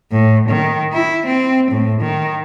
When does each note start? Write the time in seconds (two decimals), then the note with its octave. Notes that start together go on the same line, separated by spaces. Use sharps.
0.12 A2
0.49 D#3
0.93 E4
1.26 C4
1.71 A2
2.01 D#3